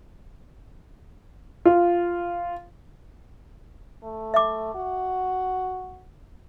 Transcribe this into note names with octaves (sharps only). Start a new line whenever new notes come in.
F4
A3
E5 D6
F#4